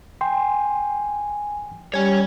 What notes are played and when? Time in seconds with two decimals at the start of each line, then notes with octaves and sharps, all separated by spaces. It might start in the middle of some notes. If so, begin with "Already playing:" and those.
0.21 G5 G#5 C6
1.94 G3 C#5 G#5